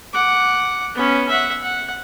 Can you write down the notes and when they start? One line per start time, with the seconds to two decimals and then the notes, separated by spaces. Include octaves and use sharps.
0.13 F#5 D6
0.95 B3 C#4
1.28 E5 F#5
1.62 F#5